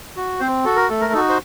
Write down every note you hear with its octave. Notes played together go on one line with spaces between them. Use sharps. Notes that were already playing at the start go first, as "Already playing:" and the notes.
F#4
C4 C5
F#4 A4
A#4
A3 A4
A#4
D#4 F#4 A4
C5